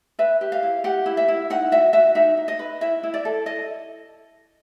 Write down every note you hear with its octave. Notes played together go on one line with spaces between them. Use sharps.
B4 E5
G4
F5
E4
G4 F#5
E4
E5
E4
D#4 F#5
F#4 E5
F#4 E5
D#4 E5
D#4
D#5
B4
E4 E5
E4
D5
A4
E4 D#5